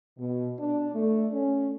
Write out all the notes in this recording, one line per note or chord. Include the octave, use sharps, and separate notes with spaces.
B2
D4
A3
C#4